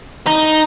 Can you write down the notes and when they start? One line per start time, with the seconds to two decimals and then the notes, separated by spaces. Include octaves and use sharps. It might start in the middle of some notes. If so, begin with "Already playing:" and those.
0.27 D#4